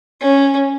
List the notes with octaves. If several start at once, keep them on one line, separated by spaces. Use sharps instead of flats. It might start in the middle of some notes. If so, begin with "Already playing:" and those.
C#4